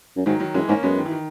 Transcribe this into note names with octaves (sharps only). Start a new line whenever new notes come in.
F#2
G#2 D#3 F#3
D#3 F#3
F#2 E3 G#3
G#2 A#3 C#4
F#2 G#3 B3
D#3
E3
D#3